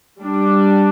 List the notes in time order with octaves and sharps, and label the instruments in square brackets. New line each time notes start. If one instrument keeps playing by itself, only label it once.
[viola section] G3 D4